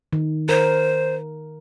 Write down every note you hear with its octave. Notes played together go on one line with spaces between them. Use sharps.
D#3
A#4 C5